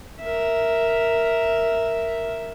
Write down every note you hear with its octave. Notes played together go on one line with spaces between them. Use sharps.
A#4 E5